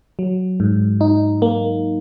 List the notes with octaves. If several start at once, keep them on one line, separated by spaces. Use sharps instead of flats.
F#3
G#2
D#4
A#3